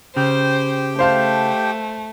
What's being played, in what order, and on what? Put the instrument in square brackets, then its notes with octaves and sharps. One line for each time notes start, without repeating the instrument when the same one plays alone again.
[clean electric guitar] C#3 [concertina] G4 G5 [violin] C5
[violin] A3 [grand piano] C5 F5 A5